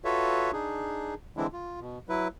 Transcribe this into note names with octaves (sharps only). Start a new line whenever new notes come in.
F4 F#4 A4 B4 C#5 E5
D4 D#4 G#4
D3 E3 G#3 C4 D4 E4
F4
B2
F#3 E4 B4